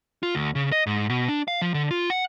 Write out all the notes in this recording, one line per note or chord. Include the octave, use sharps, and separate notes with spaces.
F4
D2
C#3
D#5
G#2
B2
D4
F5
F3
D3
F4
F#5